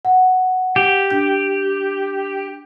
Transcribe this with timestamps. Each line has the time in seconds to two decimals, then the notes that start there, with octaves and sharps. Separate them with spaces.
0.05 F#5
0.76 G4
1.10 D4 G6